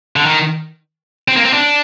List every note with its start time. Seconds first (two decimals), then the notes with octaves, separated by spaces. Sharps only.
0.16 D3
0.26 D#3
1.28 C4
1.36 A#3
1.45 C4
1.53 D4